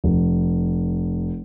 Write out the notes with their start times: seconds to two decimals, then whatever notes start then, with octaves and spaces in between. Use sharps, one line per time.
0.04 F1